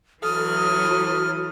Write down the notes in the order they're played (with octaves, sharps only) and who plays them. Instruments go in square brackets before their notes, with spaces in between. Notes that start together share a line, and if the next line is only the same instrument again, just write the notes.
[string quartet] E3 F#3 [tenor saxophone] A4 [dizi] D#6 [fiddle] F6